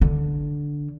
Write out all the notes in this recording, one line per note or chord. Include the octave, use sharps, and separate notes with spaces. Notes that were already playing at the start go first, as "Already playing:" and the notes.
D3